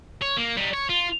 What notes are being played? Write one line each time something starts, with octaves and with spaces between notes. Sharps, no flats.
C#5
A#3
G3 D#4
C#5
F4